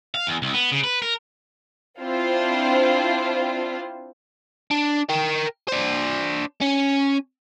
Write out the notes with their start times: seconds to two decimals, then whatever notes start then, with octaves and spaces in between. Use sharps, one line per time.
0.14 F5
0.27 E2
0.42 C2
0.54 B3
0.72 C#3
0.84 B4
1.02 A#4
1.99 C4 D4 E4 F4 C5
4.71 D4
5.09 A#4 G5
5.68 D4 C5
6.61 C#4